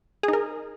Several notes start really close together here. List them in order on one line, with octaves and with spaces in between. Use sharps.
G#4 D#4 A#4